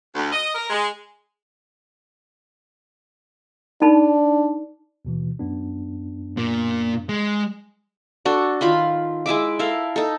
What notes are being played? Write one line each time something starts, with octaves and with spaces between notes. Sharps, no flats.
D2
D#5
A#4
G#3
D4 D#4 A5 B5
D#2 B2 E3
F#2 B3 D4
A#2 A#3
G#3
D4 F#4 A4
D#3 F4 B5 C6
G#3 E4 E5 D6
E4 A4 A#4 F5
D#4 A4